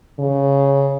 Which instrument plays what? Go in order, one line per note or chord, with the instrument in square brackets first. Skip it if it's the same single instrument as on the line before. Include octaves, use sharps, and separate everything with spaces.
[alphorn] C#3